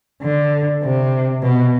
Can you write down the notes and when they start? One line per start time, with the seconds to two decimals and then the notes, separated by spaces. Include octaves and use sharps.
0.22 D3
0.83 C3
1.43 B2